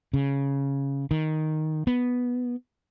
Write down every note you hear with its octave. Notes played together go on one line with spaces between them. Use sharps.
C#3
D#3
B3